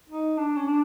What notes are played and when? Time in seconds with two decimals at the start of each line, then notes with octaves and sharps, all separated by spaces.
0.09 D#4
0.38 D4
0.57 C#4
0.66 D4